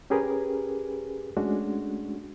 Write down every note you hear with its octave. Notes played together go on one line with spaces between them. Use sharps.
C#4 G4 G#4 A#4 B4
G#3 A3 C#4 D4 F#4